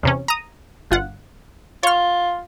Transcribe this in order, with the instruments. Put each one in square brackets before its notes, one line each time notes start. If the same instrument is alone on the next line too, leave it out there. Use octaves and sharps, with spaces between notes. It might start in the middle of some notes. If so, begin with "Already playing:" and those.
[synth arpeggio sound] E2 C3 C#4
A#5 D#6
G1 F4 F#5
[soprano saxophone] F4 [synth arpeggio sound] C#5 F6